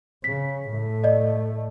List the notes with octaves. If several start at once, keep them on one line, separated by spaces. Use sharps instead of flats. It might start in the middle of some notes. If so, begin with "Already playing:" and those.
C#3 B6
A2 A3
D5 D#5